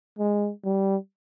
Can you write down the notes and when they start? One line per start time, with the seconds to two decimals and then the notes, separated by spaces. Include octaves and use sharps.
0.19 G#3
0.64 G3